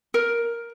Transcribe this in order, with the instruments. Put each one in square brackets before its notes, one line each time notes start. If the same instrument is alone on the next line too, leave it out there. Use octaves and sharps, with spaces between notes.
[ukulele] A#4